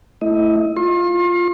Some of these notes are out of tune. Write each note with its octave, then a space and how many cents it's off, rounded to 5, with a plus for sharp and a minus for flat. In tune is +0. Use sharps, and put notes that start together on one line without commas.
A3 +0 E4 +0 D#5 +25
F4 +0 C6 +40